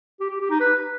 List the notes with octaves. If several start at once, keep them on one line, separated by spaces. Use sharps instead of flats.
G4
G4
G4
D#4
B4